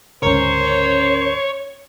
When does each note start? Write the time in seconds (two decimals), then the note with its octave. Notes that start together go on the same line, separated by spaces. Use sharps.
0.23 D2 G#2 C#3 C#4 A#4 C5 C#5